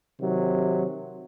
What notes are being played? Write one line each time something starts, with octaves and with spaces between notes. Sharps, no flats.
C3 D#3 F#3